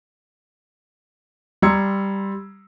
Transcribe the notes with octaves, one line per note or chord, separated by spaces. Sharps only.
G3 A#5 C6 E6 G#6 C#7